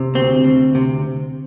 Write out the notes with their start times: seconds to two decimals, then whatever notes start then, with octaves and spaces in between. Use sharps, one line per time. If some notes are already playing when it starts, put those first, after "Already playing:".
Already playing: C3
0.15 D2 C4
0.44 D2
0.75 C3